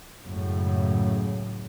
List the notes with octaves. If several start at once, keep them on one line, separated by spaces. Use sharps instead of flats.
C#2 F#2 A2 C#3